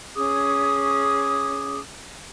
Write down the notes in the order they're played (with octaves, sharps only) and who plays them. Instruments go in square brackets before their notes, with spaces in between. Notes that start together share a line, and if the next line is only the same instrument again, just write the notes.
[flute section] C#4 G#4 D6 D#6